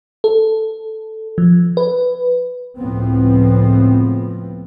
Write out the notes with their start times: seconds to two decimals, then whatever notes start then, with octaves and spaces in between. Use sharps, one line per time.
0.24 A4
1.38 F3
1.77 B4
2.77 C#2 A2 F3 B3 C4